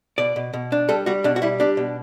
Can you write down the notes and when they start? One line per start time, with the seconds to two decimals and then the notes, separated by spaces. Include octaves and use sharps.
0.18 B2 D5
0.36 B2
0.53 B2
0.72 D4
0.89 G3 A4
1.06 G3 F#4
1.24 B2 D4
1.36 F#4
1.42 G3 E4
1.60 D4 G4
1.77 B2